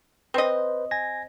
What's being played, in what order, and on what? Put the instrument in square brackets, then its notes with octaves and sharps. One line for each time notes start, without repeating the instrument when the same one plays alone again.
[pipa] C4 D#5 [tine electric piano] B4 C5
[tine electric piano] G#5 G#6 A#6